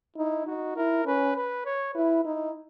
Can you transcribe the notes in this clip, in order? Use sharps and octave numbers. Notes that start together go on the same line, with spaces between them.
D#4 E4
D#4 F#4
E4 A#4
C#4 B4
B4
C#5
E4 B4
D#4 E4